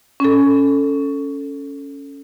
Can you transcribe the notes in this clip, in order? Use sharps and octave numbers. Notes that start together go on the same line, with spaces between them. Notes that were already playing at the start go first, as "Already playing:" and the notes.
C#4 A4